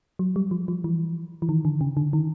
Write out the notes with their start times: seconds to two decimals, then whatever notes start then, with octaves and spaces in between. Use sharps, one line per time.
0.19 F#3
0.36 G3
0.51 F3
0.68 F3
0.84 E3
1.42 E3
1.49 D#3
1.65 D3
1.81 C#3
1.97 D3
2.13 D#3